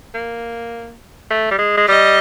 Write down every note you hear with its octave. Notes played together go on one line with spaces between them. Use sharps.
A#3
A3
G3
G#3
G#3
G3 D#5